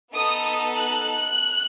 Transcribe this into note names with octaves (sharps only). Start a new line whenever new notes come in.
B3 D#4 A4 D#6
F#6